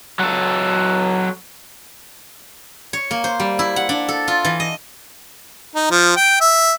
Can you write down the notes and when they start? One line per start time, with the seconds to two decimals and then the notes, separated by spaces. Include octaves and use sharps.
0.19 F#3 A4
2.93 C#5
3.11 A#3
3.24 C5
3.40 G3
3.59 E4
3.76 F#5
3.89 D4
4.08 A4
4.28 F4
4.45 E3
4.60 D#5
5.75 D#4
5.91 F3
6.16 G5
6.41 E5